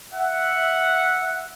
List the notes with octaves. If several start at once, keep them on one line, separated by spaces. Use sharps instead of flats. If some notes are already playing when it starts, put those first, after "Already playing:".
E5 F#5